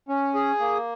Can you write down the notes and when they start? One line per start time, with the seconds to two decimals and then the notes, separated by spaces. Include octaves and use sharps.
0.09 C#4
0.34 G#4
0.60 A#3